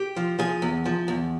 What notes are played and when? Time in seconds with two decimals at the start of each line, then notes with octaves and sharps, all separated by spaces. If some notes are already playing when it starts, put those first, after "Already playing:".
Already playing: G4
0.16 F3
0.39 F3 G#4
0.62 E2
0.85 F3
1.08 E2